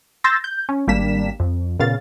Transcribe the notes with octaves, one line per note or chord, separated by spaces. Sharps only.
C6 E6 G6 A6 A#6
G6
C#4
G#1 G3 A#3 D4 B6 E7
F2
A#2 C#3 B3 F5 A6